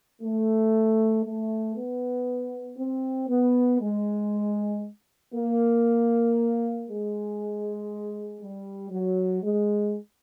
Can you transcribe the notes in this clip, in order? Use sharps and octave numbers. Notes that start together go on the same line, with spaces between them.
A3
A3
B3
C4
B3
G#3
A#3
G#3
G3
F#3
G#3